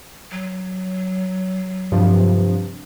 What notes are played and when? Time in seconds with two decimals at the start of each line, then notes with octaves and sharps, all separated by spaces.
0.32 F#3
1.92 G2 C3 F3